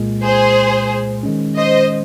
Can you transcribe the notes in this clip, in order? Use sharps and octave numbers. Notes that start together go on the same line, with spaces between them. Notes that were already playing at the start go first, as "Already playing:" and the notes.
Already playing: C2 A#2 G#3
G#4 C5
D#3 G#3 C#4
C5 D#5